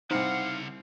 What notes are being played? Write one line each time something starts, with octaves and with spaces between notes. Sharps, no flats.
C2 C#3 C4 D#4 F5 F#5